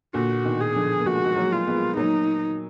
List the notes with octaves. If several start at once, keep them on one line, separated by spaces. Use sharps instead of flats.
A#2 D3 F#4
B2 D#3
G#4
D3 F3
A#3
F3 G#3 F#4
G#3
F#3 A#3
F4
G#3 B3
F#3 A#3 D#4